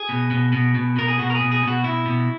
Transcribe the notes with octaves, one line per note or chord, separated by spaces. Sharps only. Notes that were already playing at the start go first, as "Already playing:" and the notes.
Already playing: G#4
B2
B2
B2
B2
B2 A#4
G#4
B2 F#4
A#4
G#4
B2
G#4
B2 F#4
B2 E4
B2